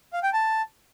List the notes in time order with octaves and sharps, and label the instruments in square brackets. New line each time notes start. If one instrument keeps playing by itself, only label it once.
[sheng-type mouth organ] F5
G5
A5